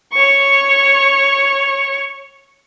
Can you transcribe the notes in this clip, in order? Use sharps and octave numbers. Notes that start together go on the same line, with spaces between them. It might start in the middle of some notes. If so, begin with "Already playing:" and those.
C#5 C#6